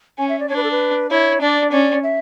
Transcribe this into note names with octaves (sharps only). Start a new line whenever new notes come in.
C#4 G#5
E5
D5
D4 C#5
B4
A4
B4
E4 C#5
D4 D5
C#4 D5
E5